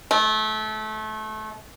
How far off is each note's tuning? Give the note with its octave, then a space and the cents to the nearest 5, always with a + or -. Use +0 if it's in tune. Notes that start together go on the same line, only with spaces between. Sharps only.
A3 -25